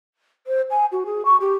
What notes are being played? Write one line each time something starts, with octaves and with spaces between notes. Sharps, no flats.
C5
G#5
F#4
G#4
C#6
G4